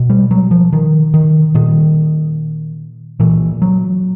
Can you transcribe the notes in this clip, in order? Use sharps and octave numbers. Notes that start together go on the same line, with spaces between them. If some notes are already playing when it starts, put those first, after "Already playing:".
Already playing: B2
G3
F#3
F3
D#3
D#3
A#2 D#3
A#2 E3
F#3